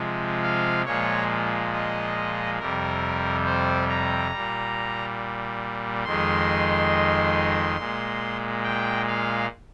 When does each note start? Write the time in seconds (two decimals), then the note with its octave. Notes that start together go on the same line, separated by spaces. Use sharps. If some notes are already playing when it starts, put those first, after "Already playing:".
Already playing: C3 F3 G#3
0.43 F5
0.85 A#2 F3 G#3 C#5
1.72 D#5
2.58 F2 C3 G3 A#4
3.45 C5
3.89 A#5
4.31 G3
4.36 A#2
6.04 F2 D#3 G#3 C6
7.77 A#2 G#3
8.63 G5
9.07 F5